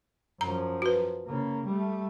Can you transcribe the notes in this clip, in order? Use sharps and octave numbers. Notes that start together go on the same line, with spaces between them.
F#2 F3 A#5
F#4 B4
C#3 A#3
G3 A3